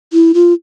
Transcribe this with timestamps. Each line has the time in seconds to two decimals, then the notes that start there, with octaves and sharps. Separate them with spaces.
0.13 E4
0.34 F4